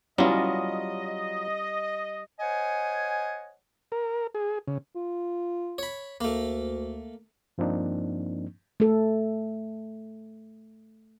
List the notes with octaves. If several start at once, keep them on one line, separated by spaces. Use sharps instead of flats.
F#3 G3 B3 C#4 E4 F4 D#5
C5 C#5 D#5 F#5 G#5
A#4
G#4
C#3
F4
C#5 B5
D2 A3 A#3
G2 F3 A#3 C4 D4 D#4
A3 A4